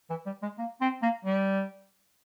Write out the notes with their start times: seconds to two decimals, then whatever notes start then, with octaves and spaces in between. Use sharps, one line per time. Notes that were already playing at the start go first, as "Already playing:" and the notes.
0.10 E3
0.26 G3
0.43 G#3
0.58 A#3
0.81 C4
1.02 A#3
1.25 G3